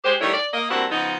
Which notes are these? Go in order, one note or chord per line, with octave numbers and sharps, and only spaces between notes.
G#3 G4 C5
D#3 G3 A3 D4 E4 C#5
D5
A#3 D#5
G2 A#3 C4 E4 F#4
C#3 F3 B3 D#4